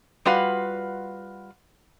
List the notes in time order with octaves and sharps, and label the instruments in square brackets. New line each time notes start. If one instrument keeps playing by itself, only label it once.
[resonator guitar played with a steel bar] G3 F4 F#4 B4 F5 F#5